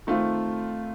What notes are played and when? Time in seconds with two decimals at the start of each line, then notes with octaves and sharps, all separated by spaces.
0.07 D#3 A3 C4 F4